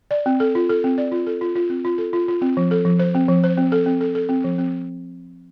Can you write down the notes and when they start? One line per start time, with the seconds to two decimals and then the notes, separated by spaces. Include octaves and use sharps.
0.11 D5
0.26 C4
0.40 A4
0.55 F4
0.70 A4
0.84 C4
0.98 D5
1.12 F4
1.27 A4
1.41 F4
1.55 F4
1.70 C4
1.85 F4
1.98 A4
2.13 F4
2.28 F4
2.41 C4
2.57 F3
2.71 A4
2.85 F3
2.99 C5
3.15 C4
3.28 F3
3.44 C5
3.57 C4
3.72 A4
3.86 C4
4.01 A4
4.15 A4
4.29 C4
4.44 F3
4.58 C4